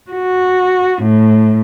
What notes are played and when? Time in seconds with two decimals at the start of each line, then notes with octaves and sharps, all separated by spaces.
0.11 F#4
1.02 A2